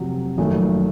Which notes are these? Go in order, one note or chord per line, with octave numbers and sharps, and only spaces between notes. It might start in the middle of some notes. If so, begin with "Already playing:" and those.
Already playing: F1 F2 C3 F#3
F#1 F2 D#3 A3